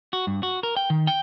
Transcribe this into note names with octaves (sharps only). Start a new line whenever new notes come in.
F#4
G2
F#4
A#4
G5
D#3
G5